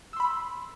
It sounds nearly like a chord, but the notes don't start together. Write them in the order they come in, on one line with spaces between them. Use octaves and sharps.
E6 C6 B5